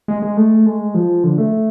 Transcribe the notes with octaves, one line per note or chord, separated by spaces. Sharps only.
G#3
G#3
A3
G#3
F3
D3
A3